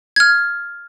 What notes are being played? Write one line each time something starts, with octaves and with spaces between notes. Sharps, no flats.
F6 G#6